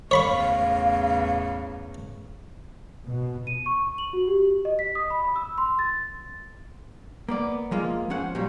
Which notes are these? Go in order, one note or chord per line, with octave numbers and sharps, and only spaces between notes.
E2 A2 C#3 C#5 F5 B5 C#6
B2
D#7
C#6
F#7
F#4
G4
D#5
B6
D#6
B5
E6
C6
A6
A#3 B3 D5
F3 G#3 A#3 F4
F2 C#4 C5 F#5
A#2 F#3 G3